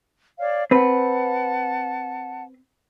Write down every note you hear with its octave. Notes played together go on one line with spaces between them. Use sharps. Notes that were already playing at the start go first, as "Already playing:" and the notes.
C#5 D5 F5
C4 B4 F#5 A5